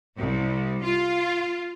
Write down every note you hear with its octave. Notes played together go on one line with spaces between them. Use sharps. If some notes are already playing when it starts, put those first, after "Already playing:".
C2
F4